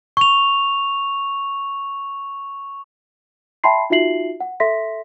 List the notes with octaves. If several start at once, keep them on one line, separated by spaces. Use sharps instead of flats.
C#6 F7
E5 G5 A5 B5 C6 C7
D#4 F4 F#4 E5 C7 F#7
F#5
A4 E5 C6 A#6 B6